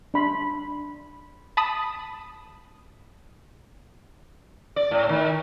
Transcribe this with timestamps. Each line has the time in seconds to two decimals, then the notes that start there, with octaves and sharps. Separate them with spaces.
0.14 D4 B5 C6
1.57 A5 B5 D#6
4.76 D5
4.91 A2
5.09 D#3